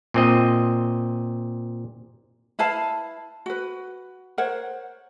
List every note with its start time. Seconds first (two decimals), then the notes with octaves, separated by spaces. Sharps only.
0.14 A#2 C4 D#5
2.59 E4 B4 F5 A5
3.46 F#4 B4
4.38 A#4 C5 C#5 F#5